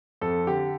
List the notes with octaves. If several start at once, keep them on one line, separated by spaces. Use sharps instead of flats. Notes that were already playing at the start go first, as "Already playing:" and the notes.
F2 A4
D3 G4